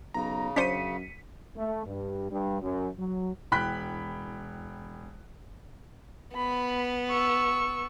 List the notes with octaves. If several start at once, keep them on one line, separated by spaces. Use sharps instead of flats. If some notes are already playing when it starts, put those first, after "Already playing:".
B1 C#3 A#5
F#2 C#4 D4 C5 B6 C#7 D#7
A3
G2
G2
F#2
F#3
E1 G5 B5 F#6 B6
B3 B5
C#6 E6